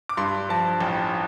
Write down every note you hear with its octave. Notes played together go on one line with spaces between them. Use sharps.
D6
G2 C6
F3 A5
A1 G5